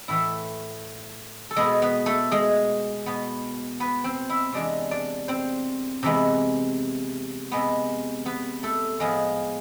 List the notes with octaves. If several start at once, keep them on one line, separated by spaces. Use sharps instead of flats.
A2 E3 A3 E4 E5
A4
B2 G#3 B3 G#4
B3 B4
A3 A4
G#3 G#4
B2 B3
B3 B4
C4 C5
E4 E5
E2 C3 G#3 D4 D5
D4 D5
C4 C5
C3 E3 G#3 B3
C3 G#3 B3
B3 B4
A3 A4
A2 F3 G#3 B3 G#4